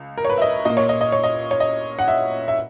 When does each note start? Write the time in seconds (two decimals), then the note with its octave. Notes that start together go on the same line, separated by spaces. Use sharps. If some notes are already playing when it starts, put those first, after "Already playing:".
Already playing: C#2
0.18 A#4
0.25 C#5
0.30 B4
0.38 E5
0.42 D#5
0.65 A#2 A#3 D#5
0.77 C#5
0.89 D#5
1.01 D#5
1.12 C#5
1.24 D#5
1.51 C#5
1.60 D#5
1.99 F#5
2.08 E5
2.48 E5